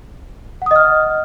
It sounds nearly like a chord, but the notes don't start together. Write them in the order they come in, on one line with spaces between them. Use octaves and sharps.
F#5 D#6 D#5 F6